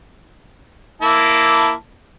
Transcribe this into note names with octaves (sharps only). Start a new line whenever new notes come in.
A#3 E4 A5